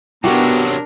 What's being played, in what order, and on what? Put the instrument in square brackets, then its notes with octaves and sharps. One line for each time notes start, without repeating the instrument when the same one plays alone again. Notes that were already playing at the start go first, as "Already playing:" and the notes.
[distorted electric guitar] C3 F#3 [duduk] B3 [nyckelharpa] D4 A#4 [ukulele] F#4 G4